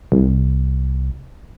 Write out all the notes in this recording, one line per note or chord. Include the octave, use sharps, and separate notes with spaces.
C2